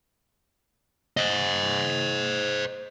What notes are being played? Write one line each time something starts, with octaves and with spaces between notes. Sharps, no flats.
C5 D#5